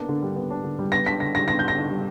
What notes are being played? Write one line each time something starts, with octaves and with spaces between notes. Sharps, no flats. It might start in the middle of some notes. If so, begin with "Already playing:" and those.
Already playing: A#3 B3 D4
D3
G3
B3
D4
D3
G3
B3 A#6
D4 B6
D3 A#6
G3 A#6
B3 A#6
D4 G6
A#6
D3
G3